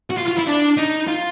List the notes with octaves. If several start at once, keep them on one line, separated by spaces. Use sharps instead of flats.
F#4
F4
F4
E4
D4
D#4
F4